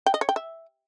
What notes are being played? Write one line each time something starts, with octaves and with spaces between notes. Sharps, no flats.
G5
D#5
C#5
G5
E5